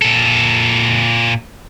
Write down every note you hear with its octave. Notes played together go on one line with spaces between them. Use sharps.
A#2 A4